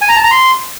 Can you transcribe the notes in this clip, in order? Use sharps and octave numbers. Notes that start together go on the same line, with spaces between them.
G#5
A#5
A5
A#5
C6